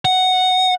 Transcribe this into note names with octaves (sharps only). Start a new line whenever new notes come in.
F#5